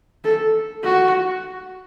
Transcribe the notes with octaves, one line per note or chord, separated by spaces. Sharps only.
A4
F#4